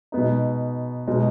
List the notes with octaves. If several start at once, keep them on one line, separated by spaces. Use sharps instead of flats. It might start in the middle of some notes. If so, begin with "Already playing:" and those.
B2 G#3 B3 D#4
B2 G#3 D#4